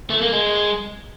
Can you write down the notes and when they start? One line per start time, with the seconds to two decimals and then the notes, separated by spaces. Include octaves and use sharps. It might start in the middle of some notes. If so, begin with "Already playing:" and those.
0.10 A3
0.21 A#3
0.32 G#3